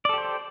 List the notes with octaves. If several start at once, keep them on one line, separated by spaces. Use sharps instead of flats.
G4 A4 C5 D5